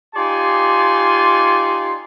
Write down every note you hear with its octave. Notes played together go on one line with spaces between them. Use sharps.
D#4 F4 G4 D5 G#5 C6